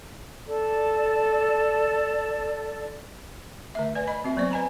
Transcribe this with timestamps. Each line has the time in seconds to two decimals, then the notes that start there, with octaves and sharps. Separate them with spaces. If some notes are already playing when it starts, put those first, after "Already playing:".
0.47 A4 D5
3.75 D3 A3 E5
3.95 B4 D5 G#5
4.07 D#5 B5
4.24 C4 F#4 E5
4.36 F#3 A#3 B3 C5 D5
4.51 B4 D#5 G#5 A#5 B5